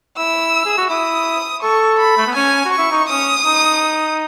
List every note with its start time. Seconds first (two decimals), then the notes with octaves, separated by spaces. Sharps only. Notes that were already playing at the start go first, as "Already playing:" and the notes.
0.18 E4 E6
0.65 G#4
0.77 F#4
0.90 E4 D#6
1.63 A4 C#6
2.00 B5
2.17 A3
2.27 B3
2.35 C#4 G#5
2.65 F#4
2.73 C#6
2.78 E4
2.91 D#4
3.09 C#4 D#6
3.45 D#4